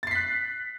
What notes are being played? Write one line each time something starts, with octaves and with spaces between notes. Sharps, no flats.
F#6 A6 B6 C7